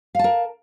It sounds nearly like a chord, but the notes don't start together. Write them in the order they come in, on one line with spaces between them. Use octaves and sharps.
F5 A5 A#4